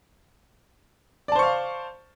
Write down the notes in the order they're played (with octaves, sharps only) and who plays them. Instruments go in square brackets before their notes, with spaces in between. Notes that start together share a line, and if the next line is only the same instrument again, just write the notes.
[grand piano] D5
A5
C5
C#6
F5